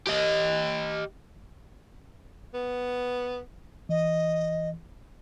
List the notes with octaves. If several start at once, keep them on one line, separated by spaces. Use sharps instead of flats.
G4 D#5
B3
E3 D#5